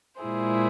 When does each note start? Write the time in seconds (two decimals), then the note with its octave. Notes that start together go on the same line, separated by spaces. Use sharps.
0.21 A#2 G#3 E4 G#4 C5